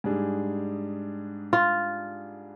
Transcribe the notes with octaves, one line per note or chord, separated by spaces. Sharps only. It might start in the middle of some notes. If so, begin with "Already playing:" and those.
G#2 G3 D4 G#4
F4